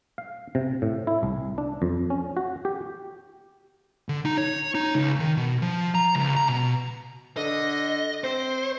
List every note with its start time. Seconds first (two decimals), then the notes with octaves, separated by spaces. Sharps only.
0.18 F5
0.55 C3
0.82 A2
1.07 E4
1.23 C2
1.58 D4
1.82 F2
2.10 C#4
2.37 F#4
2.65 G4
4.09 D3
4.25 D#4
4.38 C#5
4.75 D#4
4.95 C#2
5.20 D#3
5.37 B2
5.62 F3
5.95 A#5
6.15 C#2
6.37 A#5
6.48 B2
7.37 D3 D#5
8.24 C4 C5